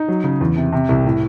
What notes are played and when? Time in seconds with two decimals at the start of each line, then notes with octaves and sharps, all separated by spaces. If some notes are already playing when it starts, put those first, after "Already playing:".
Already playing: D#4
0.08 F#3
0.24 C#3
0.41 E2
0.57 C3
0.72 C3
0.89 C2
1.05 A2